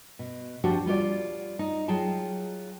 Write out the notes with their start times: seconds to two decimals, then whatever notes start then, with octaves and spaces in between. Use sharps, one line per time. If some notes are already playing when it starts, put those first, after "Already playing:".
0.19 B2
0.64 F3 C4 D4 F#4 G4 C5
0.86 G3 F4 C#5 D5
1.59 D#4
1.88 F#3 F4 G#4 G5 A5